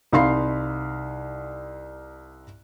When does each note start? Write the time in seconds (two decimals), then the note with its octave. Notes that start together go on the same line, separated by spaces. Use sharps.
0.13 C2 D#4 F5 B5 C6 C7